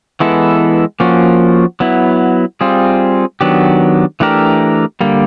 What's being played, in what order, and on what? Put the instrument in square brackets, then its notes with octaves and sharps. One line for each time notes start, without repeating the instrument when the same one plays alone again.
[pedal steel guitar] E3 G#3 B3 E4 A4
F3 A#3 C#4 F#4
F#3 B3 E4
G3 C4 F4 G#4
D#3 F#3 B3 D4 G4
E3 A3 D4 G4 A#4
D3 G3 A#3